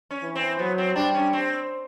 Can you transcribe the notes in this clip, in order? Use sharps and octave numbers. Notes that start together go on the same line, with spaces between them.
C#4
E3
C4
F#3 B3
C4
G3 D4
C#4
C4